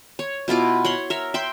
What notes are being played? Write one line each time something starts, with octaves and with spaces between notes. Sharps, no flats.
C#5
B2 E4 F4 D6
C#5 F#5 B5 C6
A#4 C#5 E5
E5 G5 C6